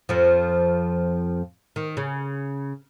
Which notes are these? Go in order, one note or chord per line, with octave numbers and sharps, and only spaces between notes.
F2 F3
D#3
C#3